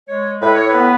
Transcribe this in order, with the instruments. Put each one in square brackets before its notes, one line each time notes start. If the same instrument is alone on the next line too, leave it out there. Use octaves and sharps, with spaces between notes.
[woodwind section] G#3 C#5
A2 B4
C#5
B4
B3